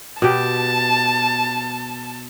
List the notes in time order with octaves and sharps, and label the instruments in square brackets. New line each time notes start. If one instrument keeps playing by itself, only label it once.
[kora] B2 G4 [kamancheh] A5